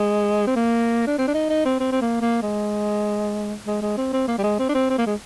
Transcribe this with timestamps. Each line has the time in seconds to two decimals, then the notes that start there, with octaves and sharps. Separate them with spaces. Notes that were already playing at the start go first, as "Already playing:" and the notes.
Already playing: G#3
0.47 C4
0.56 A#3
1.07 D4
1.18 C4
1.27 D4
1.34 D#4
1.50 D#4
1.65 C4
1.80 C4
1.92 C4
2.01 A#3
2.21 A#3
2.42 G#3
3.66 G#3
3.82 G#3
3.97 C4
4.13 C4
4.28 A#3
4.38 G3
4.44 G#3
4.59 C4
4.69 D4
4.74 C4
4.90 C4
4.98 A#3
5.06 G#3